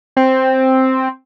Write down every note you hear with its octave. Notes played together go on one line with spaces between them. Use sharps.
C4